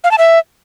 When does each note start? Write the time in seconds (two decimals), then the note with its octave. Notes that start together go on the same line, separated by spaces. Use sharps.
0.04 F5
0.11 A5
0.18 E5